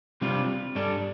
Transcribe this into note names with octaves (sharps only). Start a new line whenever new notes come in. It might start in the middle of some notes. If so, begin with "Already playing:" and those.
C3 G3 D4 F4
G2 G3 D4 A4